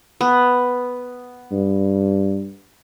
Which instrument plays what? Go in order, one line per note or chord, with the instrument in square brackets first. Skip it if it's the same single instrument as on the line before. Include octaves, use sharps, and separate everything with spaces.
[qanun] B3
[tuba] G2